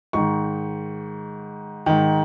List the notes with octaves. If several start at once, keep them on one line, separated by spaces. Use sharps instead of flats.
G#2 D#3 C#6
G#2 D#3